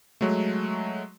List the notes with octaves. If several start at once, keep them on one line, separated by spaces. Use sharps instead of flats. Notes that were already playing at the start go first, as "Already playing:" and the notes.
F#3 G#3 A3